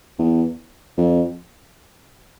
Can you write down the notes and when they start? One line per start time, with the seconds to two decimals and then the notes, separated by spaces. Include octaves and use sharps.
0.19 E2
0.97 F2